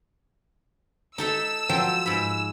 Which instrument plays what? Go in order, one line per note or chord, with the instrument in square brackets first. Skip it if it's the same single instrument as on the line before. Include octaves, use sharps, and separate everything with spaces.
[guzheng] D#4 A4 E5 [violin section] E6
[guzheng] F3 F#3 G5
G#2 B5